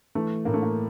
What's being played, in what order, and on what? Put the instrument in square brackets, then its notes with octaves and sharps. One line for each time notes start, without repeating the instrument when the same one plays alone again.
[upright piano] E3 A3
A2 A#3
A3
A#3